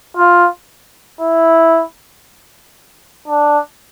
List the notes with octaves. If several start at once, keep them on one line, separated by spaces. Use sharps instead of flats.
F4
E4
D4